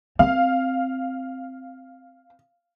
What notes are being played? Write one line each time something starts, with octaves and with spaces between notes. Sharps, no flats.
C4 F5